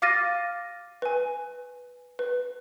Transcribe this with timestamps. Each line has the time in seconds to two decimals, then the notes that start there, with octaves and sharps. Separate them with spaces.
0.02 F5 D6 F6 A6 A#6 D#7
1.02 B4 G#5
2.19 B4